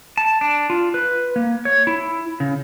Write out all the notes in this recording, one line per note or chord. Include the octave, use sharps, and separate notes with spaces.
A5
D4
F4
B4
A#3
C#5
E4
C#3